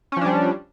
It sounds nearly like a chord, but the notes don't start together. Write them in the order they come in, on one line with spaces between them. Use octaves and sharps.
C#4 F3 D4 G3